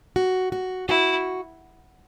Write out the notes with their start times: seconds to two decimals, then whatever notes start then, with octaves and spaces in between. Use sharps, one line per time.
0.16 F#4
0.52 F#4
0.88 E4 F#4